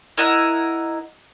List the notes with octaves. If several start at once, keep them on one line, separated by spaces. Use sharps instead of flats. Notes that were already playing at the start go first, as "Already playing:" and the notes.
E4 A#4 D#5 F#5